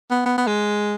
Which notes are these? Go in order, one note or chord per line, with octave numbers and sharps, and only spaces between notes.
B3
B3
B3
G#3